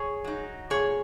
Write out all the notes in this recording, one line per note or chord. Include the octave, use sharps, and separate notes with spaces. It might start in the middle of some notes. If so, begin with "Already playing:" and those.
Already playing: G#4 C#5
F#3 D#4
A#2 G#4 C#5